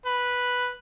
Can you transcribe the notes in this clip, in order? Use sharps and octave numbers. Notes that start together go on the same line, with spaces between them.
B4